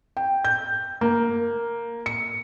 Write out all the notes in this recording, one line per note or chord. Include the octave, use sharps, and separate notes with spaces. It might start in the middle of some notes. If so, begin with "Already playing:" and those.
G5
G6
A#3
C#7